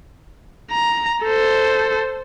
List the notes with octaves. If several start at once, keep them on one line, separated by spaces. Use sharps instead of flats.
A#5
A4 C5